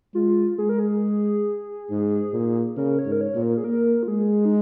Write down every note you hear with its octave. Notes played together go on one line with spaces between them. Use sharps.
G#3 F4
G#3 G#4
A#4
G#4
G#2
A#2
C#3 A#4
C#5
G#2
A#4
C#5
A#2
A#4
G#4
A#3 A#4
F4
G#3 G#4
D#4